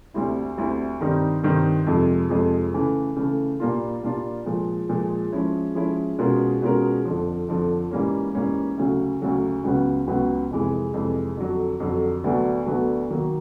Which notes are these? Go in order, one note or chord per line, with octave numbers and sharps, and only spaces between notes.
D2 D3 G3 C4 E4
D2 D3 G3 C4 E4
G2 D#3 G3 C4 D#4
G2 D#3 G3 C4 D#4
F2 C3 F3 G#3
F2 C3 F3 G#3
C#3 E3 A3
C#3 E3 A3
A#2 G3 A#3 D4 F4
A#2 G3 A#3 D4 F4
A#2 F3 G#3
A#2 F3 G#3
F3 G#3 C#4 E4
F3 G#3 C#4 E4
B2 G#3 C#4 F4 A#4
B2 G#3 C#4 F4 A#4
F2 D3 F3
F2 D3 F3
G#2 E3 G3 A#3 C#4
G#2 E3 G3 A#3 C#4
D2 C#3 F#3
D2 C#3 F#3
C#2 C#3 F#3 B3
C#2 C#3 F#3 B3
F2 C3 E3 G#3
F2 C3 E3 G#3
F2 D3 F#3
F2 D3 F#3
D2 D3 F#3 B3 D4
D2 D3 F#3 B3 D4
D#3 F#3 A#3